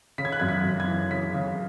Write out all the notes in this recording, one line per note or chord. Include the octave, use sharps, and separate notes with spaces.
C#3 B6
G#6
F#6
F#2 G#6
B6
F#2
G#6
E3
C#3 B6
C#3